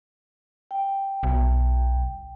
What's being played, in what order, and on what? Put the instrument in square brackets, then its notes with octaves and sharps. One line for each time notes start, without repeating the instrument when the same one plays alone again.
[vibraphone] G5
[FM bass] B1